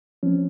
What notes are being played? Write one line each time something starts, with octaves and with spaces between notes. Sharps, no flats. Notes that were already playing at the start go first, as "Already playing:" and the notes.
F3 C4 C#4